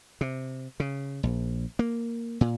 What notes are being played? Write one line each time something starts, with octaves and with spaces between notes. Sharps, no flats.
C3
C#3
A#1
A#3
A#2